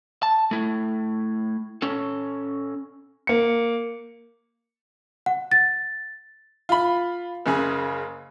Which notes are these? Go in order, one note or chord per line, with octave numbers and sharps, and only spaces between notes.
A5
A3 E4
C#4 A4
A#3 C#7
F#5
A6
F4 B5
F#1 C#3 G#4